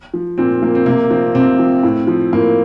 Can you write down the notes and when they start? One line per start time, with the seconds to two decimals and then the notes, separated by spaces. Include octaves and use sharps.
0.14 F3
0.38 A#2 C4
0.62 F3 A#3
0.75 C4
0.86 C3 A#3
1.10 F3 C4
1.35 C3 C4
1.59 F3
1.83 A2
2.07 F3
2.33 A2 A#3